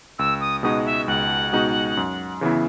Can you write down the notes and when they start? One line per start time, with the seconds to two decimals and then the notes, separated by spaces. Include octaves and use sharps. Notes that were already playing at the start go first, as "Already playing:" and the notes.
0.19 C#2 E6
0.41 D#6
0.63 B2 G#3 D#4 F#4 D#6
0.86 E5
1.08 C#2 F#5
1.53 B2 G#3 D#4 F#4
1.97 F#2
2.41 C#3 E3 B3 E4